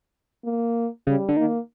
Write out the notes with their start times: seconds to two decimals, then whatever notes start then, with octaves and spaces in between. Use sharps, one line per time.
0.45 A#3
1.07 C#3 G3
1.28 D3
1.37 D#3 A#3